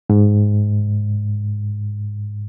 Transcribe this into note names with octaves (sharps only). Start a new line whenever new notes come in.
G#2